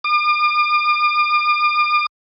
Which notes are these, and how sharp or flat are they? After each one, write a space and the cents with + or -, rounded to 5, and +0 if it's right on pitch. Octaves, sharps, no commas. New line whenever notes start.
D6 +45